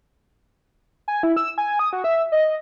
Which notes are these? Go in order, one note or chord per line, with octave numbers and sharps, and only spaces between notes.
G#5
E4
E6
G#5
D#6
F#4
E5
D#5